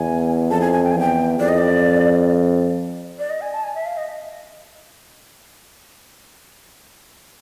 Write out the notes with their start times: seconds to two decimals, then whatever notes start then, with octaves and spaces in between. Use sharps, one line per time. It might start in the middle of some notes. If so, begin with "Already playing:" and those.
Already playing: E2 G#5
0.50 F2 A5
0.61 G#5
0.73 G#5
0.84 G5
0.92 G#5
0.95 E2 G5
1.40 F2 D5
1.49 D#5
1.58 D5
3.19 D5
3.30 D#5
3.41 G#5
3.53 A5
3.64 G#5
3.75 E5
3.86 F5
3.97 D#5